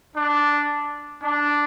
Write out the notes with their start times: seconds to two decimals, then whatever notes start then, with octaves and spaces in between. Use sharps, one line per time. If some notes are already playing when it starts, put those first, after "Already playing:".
0.15 D4
1.22 D4